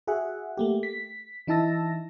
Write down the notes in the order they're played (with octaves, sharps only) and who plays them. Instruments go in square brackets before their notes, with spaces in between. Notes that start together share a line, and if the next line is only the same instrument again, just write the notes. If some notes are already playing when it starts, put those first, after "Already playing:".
[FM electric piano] F#4 G#4 E5 F#5
A3 A#3 G4
B6
E3 D#4 E4 A5 E6 A#6